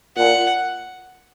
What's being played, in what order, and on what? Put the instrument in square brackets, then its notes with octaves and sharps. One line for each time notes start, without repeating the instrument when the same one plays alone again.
[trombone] A#2 [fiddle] F#5